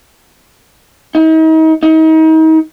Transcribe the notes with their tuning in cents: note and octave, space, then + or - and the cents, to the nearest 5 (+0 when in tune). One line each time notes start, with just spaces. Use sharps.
D#4 +40
D#4 +35